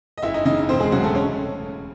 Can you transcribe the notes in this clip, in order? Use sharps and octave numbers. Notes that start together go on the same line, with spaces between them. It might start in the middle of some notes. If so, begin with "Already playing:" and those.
D#5
F#1 E4 E5
D#4 D#5
C#3 D#4 D#5
E1 C4 C5
G#3 G#4
C#3 F#3 F#4
A3 A4
C#4 C#5